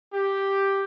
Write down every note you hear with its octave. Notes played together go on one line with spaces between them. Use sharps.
G4